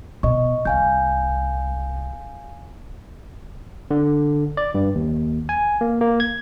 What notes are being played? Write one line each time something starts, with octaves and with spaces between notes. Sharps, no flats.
B2 D#5 C#6
C2 F5 G#5 G6
D3
D5
G2
D#2
G#5
A#3
A#3
G#6